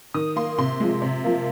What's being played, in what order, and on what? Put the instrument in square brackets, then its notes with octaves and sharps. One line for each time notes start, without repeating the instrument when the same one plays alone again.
[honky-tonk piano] D#3 D#6
A#3 C6
C3 C6
F3 G#3
C3
F3 A#3